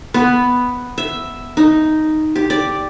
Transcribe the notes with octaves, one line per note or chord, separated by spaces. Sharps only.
B3
E5
D#4
G4
D5